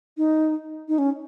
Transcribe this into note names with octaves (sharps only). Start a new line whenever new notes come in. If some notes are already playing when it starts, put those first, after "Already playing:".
D#4
D#4
C#4